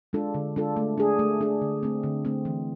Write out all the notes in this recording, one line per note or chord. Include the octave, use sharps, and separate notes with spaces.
G#3 D4 F4 A4
D3
G#3 D4 F4 A4
A3
D4 G#4
A3
D4 G#4
D3
A3 C4
D3
A3 C4
E3